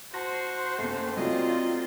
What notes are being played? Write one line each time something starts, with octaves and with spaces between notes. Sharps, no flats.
F#4 C5 A5 C6 A#6
F#1 D#2 A3
F#3 A3 C4 D4 F4 D#5